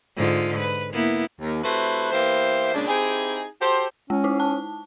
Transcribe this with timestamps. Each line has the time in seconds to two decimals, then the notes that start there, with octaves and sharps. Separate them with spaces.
0.17 G#2 D3 F4
0.60 B4
0.94 A#3 B3 E4
1.40 D#2
1.62 C3 A3 E4 F#4 B4 C5
2.12 E3 A#3 B3 G4 C5 E5
2.73 A#2 C#3 G#3 D4
2.87 C4 D#4 E4 G4 G#4
3.60 F#4 G4 A4 C5
4.10 G#3 C#4
4.24 D#4 E4
4.40 A5